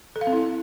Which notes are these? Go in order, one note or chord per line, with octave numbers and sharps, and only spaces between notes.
A4
F5
C4
E4